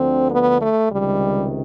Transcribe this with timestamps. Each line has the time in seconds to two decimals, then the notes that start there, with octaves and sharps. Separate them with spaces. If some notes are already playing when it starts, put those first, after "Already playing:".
Already playing: D2 D3 F3 C4
0.31 B3
0.61 A3
0.91 C#2 C3 D#3 G3